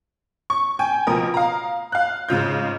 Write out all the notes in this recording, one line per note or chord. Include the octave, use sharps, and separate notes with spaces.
C#6
G5 G#5
C#2 B2 F3 A#4 D#6
F5 A#5
F5 F#6
G#2 C#3 F4 G6